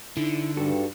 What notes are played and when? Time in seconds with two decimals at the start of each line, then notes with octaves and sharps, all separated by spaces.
0.17 D3 D#4 E4
0.57 G2 F#4 A4